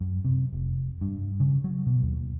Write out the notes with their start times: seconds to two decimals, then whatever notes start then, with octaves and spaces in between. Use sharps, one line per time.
0.01 F#2
0.25 C3
0.52 F1
1.01 G2
1.40 C#3
1.64 F#3
1.86 B2
2.03 D#2